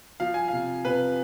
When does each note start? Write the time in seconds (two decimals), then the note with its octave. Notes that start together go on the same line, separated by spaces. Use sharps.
0.20 F3 F5
0.34 G#5
0.48 C3 F5
0.85 C3 B4